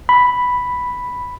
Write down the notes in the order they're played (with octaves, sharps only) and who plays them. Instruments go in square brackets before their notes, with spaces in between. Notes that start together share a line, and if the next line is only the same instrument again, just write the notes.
[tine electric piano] B5